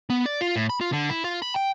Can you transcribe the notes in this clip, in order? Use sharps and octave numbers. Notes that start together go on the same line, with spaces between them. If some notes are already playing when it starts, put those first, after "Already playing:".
B3
D5
F4
A2
B5
F4
D3
E4
F4
B5
G5